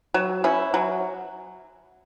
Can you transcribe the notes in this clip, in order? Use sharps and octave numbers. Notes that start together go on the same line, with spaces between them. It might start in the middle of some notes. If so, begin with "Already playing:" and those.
F#3
C#4 E4
F#3